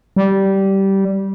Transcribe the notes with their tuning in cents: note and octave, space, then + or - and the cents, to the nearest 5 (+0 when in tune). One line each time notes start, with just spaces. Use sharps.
G3 -15